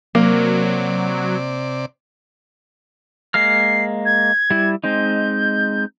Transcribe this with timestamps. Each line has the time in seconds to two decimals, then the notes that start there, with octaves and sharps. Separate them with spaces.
0.15 C3 F#3 A#3 D5
3.34 G#3 A#3 F6 C7
4.05 G#6
4.51 G3 E4
4.84 G#3 C4 D#4 G6